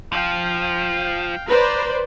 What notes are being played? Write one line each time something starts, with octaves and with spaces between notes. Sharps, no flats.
F3 F5 G5
B4 C5 D5 A#5